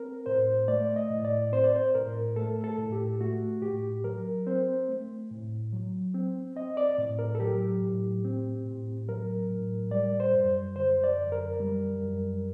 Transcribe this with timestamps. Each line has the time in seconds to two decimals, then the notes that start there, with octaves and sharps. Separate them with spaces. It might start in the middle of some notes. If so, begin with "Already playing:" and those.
Already playing: C4 A#4
0.26 A2 C5
0.68 A3 D5
0.96 D#5
1.10 A2
1.25 D5
1.52 C4 C5
1.64 D5
1.76 C5
1.95 A2 A#4
2.36 A3 A4
2.64 A4
2.78 A2
2.92 G4
3.21 A3 F#4
3.62 A2 G4
4.04 F#3 A#4
4.47 C4 C5
4.89 A3
5.30 A2
5.73 F#3
6.15 C4
6.56 C4 D#5
6.77 D5
6.98 A2
7.19 A#4
7.35 A4
7.40 F#3 G4
7.82 A2
8.25 C4
8.66 A2
9.08 F#3 A#4
9.50 A2
9.91 G3 D5
10.20 C5
10.34 F#2
10.76 D3 C5
11.04 D5
11.18 F#2
11.32 A#4
11.60 G3
12.02 F#2